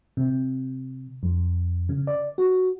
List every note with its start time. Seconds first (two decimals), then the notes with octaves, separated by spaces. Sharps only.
0.17 C3
1.23 F2
1.89 C#3
2.07 D5
2.38 F#4